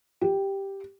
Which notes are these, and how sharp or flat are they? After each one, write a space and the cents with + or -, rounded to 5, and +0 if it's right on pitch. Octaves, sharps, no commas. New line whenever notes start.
G4 +0